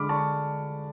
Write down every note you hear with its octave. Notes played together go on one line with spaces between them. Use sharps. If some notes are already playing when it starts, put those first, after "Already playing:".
Already playing: D3 G#3 B5 D6 F6
D4 A5 C#6